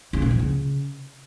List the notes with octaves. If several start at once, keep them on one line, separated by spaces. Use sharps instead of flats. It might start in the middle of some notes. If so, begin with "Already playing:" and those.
C#3
A#2
F3
C#3